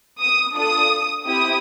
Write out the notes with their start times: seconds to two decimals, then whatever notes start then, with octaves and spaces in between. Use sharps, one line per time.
0.20 D#6
0.55 D4 F4 A4 D#6
1.26 C4 E4 G4 D#6